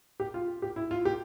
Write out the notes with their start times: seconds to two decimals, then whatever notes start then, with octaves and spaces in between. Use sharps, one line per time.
0.20 G4
0.34 F4
0.62 G4
0.76 E4
0.91 F4
1.05 G4